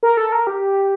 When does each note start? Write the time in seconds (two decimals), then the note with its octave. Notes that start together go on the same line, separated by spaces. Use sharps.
0.03 A#4
0.17 A4
0.32 A#4
0.47 G4